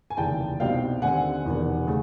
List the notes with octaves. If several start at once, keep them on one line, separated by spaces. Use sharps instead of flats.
G#5
F1 D#2 C#3 E3 G5 A5
C2 B2 G3 C4 D#4 F5 G5
D#2 D3 G3 C4 F#5 G#5
E1 E2 C3 D#3
C#3 A3